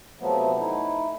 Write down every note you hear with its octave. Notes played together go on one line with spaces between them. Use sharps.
C3 F3 F#3 A3 B3
A3 D#4 E4